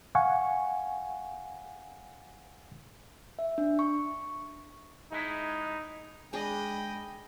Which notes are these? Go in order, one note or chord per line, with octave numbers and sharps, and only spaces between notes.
F5 F#5 G#5 C#6
E5
D4
C#6
G#3 D#4 E4
G#3 D4 G#4 D#5 G5 B5